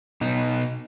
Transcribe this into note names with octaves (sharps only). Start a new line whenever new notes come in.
B2 D#4